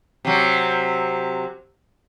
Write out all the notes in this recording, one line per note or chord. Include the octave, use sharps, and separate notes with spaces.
C3 F#3